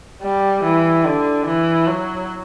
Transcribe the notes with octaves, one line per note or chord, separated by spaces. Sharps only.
G3
E3
D3
E3
F#3